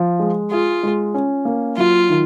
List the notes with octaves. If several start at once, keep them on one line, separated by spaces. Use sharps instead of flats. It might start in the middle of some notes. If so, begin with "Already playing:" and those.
Already playing: F3
G#3
F4 G#4
G#3
C#4
A#3
F#3 F4
D#3